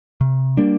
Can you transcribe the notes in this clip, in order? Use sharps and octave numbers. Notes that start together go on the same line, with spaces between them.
C3
G3 A#3 D4